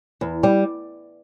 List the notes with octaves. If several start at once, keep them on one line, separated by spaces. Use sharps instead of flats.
E2
G3